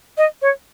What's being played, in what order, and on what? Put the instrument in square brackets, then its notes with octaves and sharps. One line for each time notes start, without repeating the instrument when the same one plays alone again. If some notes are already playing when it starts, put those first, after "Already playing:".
[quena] D#5
C#5